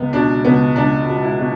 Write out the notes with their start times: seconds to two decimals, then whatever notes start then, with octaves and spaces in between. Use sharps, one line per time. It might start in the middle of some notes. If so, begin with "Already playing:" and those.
Already playing: C#2 B3
0.13 B2 D4
0.45 C#2 B3
0.76 C#2 D4
1.07 B2
1.23 E4
1.39 B2